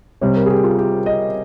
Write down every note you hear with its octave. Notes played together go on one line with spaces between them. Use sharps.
C3 G3 C#5
A#4
G#4
G4
F4
G4
D#5